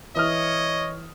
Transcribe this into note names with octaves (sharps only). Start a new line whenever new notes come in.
E3 C#5 D#5 D#6 F6